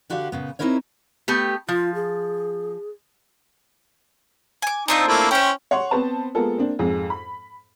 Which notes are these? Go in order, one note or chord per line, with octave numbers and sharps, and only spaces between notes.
D3 F#4 G4 D5 F5
A#2 C#3 B3
C4 C#4 D#4 E4 A#4 C#5
A3 B3 G4
F3 F4
G#4
G#5 D6
C4 D4 D#4 F4
A3 A#3 E4
C#4 E4 C5 G5
C#5 F#5 C6 C#6
B3 C4 B4 C5 A5
G#3 A#3 B3 F4 A4 A#4
A#3 C4 D4
F2 G#2 G#3
B5